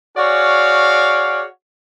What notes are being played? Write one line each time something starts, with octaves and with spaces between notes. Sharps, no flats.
F#4 G#4 C#5 D5 F5